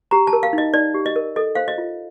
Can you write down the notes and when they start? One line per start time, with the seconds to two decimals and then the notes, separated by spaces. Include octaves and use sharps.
0.11 G4 A#5
0.27 A5
0.33 A#4
0.43 F5
0.53 D#4 D#5
0.74 D#4 D5
0.94 G4
1.06 D#5
1.16 A#4
1.36 A4 D#5
1.55 C5 F5
1.68 D#5
1.78 F4